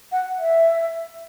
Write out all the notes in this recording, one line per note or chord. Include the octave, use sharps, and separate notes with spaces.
F#5
E5